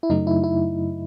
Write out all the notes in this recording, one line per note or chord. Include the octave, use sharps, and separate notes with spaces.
E4
F#2 C#3 F#3 A3 D#4
E4
E4